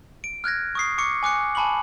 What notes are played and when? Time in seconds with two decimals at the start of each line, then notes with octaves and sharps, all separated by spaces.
0.24 D7
0.44 F6 F#6 G#6 A#6
0.75 C#6 D#6 C7
0.98 C#6 D6 C#7
1.23 G#5 D6 F#6 C#7
1.55 G#5 A5 B5 C#6 F#7